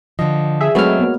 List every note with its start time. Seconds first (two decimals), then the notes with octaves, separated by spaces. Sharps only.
0.19 D3 F3 D#5
0.61 G#4 E5
0.75 F#3 G#3 A3 C4 F#4 B4 C#5 F6
0.99 A#3 B3